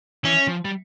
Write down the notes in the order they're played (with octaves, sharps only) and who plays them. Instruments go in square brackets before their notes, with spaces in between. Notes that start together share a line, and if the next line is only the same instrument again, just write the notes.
[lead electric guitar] E3 [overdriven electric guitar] C#4
[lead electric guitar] F3
G3